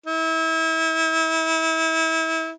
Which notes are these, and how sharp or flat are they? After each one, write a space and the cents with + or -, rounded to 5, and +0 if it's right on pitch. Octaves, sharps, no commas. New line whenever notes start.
E4 -30